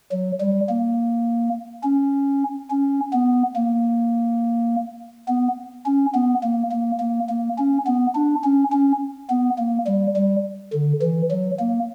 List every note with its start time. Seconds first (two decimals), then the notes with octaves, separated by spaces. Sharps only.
0.12 F#3
0.40 G3
0.69 A#3
1.84 C#4
2.70 C#4
3.13 B3
3.55 A#3
5.28 B3
5.86 C#4
6.15 B3
6.43 A#3
6.71 A#3
7.00 A#3
7.29 A#3
7.58 C#4
7.87 B3
8.15 D4
8.44 C#4
8.72 C#4
9.30 B3
9.58 A#3
9.87 G3
10.16 G3
10.73 D3
11.02 E3
11.31 F#3
11.59 A#3